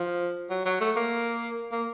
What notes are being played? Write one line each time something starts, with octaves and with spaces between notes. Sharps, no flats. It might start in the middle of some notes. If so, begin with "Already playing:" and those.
Already playing: F3
F#3
F#3
A3
A#3
A#3